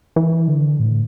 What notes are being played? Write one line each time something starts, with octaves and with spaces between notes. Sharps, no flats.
E3
D3
A2